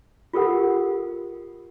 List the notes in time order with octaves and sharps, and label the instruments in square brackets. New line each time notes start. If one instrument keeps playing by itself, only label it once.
[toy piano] F4 G4 A4 A#4 F#5